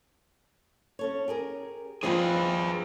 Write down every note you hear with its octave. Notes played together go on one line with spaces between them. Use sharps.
C#4 A4 C#5
G4 G#4 A#4
G2 F3 C4 F4 G#4 B4 D#5 G5